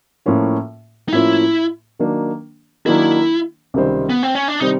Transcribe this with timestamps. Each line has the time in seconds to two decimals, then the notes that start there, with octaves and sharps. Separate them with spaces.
0.26 A2 F3 A#3 C#4 F4
1.08 D#4
1.12 A2 F3 A#3 C#4 E4 F4
1.99 D#3 F#3 A#3 D4
2.86 D#3 F#3 A#3 D4 E4
3.74 C#2 C3 D#3 G3 C4
4.10 B3
4.23 C4
4.35 C#4
4.48 D4
4.60 C3 D#3 G3 C4 D#4